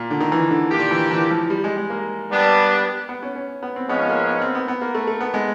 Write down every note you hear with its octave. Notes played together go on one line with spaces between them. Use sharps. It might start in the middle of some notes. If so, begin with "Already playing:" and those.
Already playing: A#2
D3
D#3
E3
D3
A#2 D#3 G3 A#3 D4 G4
E3
E3
F3
G3
G#3
G#3
A#3
G3 B3 D4
B3
C#4
C#4
B3
C4
G#2 F3 G#3 B3 C#4
A#3
B3
C4
B3
B3
A#3
A3
A3
B3
G#3